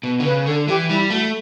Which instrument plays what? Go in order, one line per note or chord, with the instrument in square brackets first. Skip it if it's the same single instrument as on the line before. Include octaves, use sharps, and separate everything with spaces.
[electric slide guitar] B2
D3
[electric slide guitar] C#3 [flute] B4
[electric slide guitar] D3 [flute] A4
[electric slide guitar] E3 [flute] G4
[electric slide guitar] G3 [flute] E4
[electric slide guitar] A3 [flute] F#4